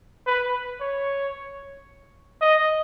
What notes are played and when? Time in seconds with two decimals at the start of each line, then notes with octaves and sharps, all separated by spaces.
0.27 B4
0.81 C#5
2.42 D#5